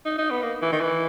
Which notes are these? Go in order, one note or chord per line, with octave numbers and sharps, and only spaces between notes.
D#4
D#4
B3
A#3
E3
D#3
E3